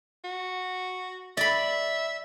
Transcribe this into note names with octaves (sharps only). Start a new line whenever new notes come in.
F#4
D5 E5 B5